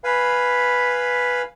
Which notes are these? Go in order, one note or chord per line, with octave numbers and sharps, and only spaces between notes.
B4 F5 G#5 B5